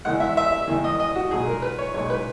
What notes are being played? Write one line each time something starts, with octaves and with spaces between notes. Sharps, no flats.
E2 D#3 G#3 F#5
E5
E5
E5
E2 D#3 G#3
D#5
D#5
F#4
B1 A#2 G#3 G#4
A#4
B4
C#5
B1 A#2 G#3 C#5
B4